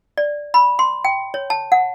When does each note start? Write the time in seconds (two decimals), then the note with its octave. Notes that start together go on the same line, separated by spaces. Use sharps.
0.17 D5
0.54 B5
0.79 C6
1.05 G5
1.34 C#5
1.50 A5
1.72 F#5